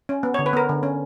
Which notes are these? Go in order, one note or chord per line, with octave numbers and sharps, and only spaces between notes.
C#4
B3
C#5
D3
B4
B3 A#4
D3
C#4